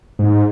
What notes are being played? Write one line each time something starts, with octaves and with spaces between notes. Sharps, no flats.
G#2